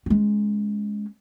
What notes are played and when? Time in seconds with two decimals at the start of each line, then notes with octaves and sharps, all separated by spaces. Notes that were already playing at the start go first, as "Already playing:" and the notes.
0.06 G#3 C#4